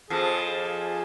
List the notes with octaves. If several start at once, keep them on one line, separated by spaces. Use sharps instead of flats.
F2 F3 G#4
G#4